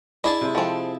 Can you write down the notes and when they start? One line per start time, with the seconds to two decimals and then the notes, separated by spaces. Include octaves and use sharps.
0.24 D4 E4 G#4 D#5 A5
0.41 C3 G#3
0.55 F3 G#3 C4 A4